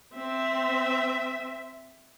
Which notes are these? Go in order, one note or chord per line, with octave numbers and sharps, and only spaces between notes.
C4 E5